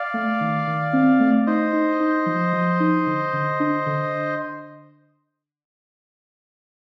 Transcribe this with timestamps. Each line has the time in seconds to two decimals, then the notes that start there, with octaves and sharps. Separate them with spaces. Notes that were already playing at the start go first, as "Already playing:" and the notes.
Already playing: D5 F5
0.14 A3
0.41 D#3
0.67 D#3
0.93 C4
1.20 A3
1.46 D#4 C5 D#5
1.73 D#4
2.00 D#4
2.26 F3
2.53 F3
2.80 D#4
3.07 D3
3.33 D3
3.60 D4
3.86 D3